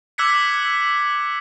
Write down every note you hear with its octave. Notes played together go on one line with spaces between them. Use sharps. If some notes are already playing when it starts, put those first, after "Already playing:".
D6 E6 F#6 G#6 B6 C#7